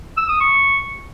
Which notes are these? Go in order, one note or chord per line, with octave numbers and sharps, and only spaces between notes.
E6
D#6
C#6